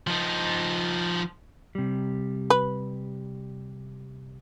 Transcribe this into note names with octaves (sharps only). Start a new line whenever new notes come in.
F3 D#4
C3 G3
B4